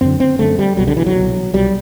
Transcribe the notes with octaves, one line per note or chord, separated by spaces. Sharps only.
F#2 D3 C4
C4
F#2 D3 A3
G3
C2 B2 F#3
D3
E3
F#3
C2 B2
C2 B2 G3